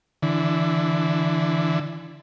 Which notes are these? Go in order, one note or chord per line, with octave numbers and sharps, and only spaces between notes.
D3 E3